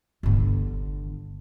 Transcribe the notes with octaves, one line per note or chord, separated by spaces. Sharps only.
G1 D3